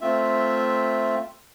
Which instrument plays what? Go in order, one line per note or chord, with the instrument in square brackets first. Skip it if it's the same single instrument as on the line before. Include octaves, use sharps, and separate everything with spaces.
[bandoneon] A3 C4 F4 E5